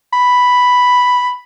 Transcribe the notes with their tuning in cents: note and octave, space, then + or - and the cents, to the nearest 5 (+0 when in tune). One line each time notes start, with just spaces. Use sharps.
B5 +0